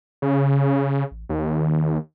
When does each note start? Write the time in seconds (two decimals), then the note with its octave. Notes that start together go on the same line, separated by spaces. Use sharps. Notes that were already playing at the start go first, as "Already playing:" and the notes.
0.22 C#3
1.11 A1
1.29 D#2 D#3